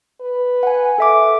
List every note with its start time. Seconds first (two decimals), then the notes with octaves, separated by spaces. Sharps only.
0.21 B4
0.63 F#5 G#5
0.98 A4 E5 D6